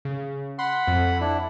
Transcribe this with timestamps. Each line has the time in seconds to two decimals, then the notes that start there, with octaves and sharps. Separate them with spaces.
0.05 C#3
0.59 F#5 B5 C6
0.87 F2
1.20 D4 E4